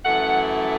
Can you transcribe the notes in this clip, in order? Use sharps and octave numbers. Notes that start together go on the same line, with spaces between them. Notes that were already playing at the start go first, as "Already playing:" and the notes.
F#2 E3 A3 F#5